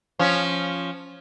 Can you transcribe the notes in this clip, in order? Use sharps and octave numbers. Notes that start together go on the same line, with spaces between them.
F3 C#4